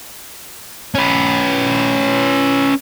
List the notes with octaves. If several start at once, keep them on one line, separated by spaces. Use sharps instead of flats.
C#4 B4